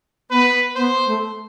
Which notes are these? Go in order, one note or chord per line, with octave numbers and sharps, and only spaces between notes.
B3 B4
B3 C5
A3